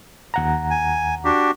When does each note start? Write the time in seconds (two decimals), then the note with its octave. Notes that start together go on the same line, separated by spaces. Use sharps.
0.34 D#2 F#5 A#5
0.71 G#5
1.25 D4 F#4 G4